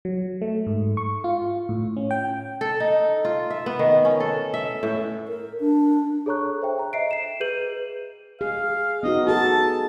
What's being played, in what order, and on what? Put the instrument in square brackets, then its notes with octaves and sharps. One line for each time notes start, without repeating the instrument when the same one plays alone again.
[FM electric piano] F#3
A3
G#2
C#6
F4
A2
C#4
G5
[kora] A4
D#4
F4
E5
B3
D#3
C#4
A4
E5
A2
[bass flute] A#4
D4
[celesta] G#4 A4 C#5 A#5 C#6 F#6
C5 E5 G5
A#5
D#5 E5 C7 D7
C7 E7
G#4 B4 G6 D#7 F#7
[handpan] G#4 [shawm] F5
[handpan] B3 D#4 F#4 [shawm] D#5
[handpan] F#4 G#4 A4 [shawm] A5